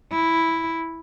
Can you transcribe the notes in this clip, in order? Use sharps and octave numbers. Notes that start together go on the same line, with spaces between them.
E4